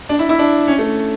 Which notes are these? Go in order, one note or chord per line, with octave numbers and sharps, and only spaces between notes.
D4
E4
E4
D4
C#4
A3